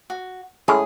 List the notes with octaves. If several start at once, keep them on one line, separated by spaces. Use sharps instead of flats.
F#4
A2 G#3 C#4 G#4